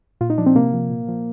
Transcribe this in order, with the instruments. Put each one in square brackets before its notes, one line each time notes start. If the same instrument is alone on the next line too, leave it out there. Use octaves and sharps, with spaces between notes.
[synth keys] A#2 F4
D#4
F3 D4
C4
C3 A#3
F3
A#2
F3